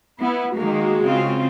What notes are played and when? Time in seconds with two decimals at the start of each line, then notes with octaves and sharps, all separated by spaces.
0.21 B3 E4
0.57 D#3 G#3 A#3 F#4
1.03 C#3 C4 F4